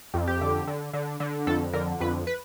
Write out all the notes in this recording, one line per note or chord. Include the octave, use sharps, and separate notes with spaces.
F2
G4
D3
D3
D3
D3
F2 A4
D3 A#4
F2 B4
B4